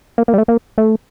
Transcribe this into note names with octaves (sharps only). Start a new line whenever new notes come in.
A#3
A#3
G3
A3
A#3
A3